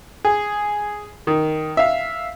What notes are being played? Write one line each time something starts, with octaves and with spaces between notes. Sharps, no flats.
G#4
D#3
E5 F5